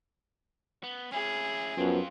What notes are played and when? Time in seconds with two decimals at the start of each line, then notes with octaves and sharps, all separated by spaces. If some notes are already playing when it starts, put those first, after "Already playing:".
0.84 B3
1.12 C#4 E4 G#4
1.78 F#2 F3 B3 C4 F4